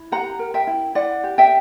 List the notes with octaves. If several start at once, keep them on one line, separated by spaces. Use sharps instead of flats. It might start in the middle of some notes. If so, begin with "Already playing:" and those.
Already playing: E4
G4 F#5 A#5
A#4
E5 G5
E4
E4 D5 F#5
G4
E5 G5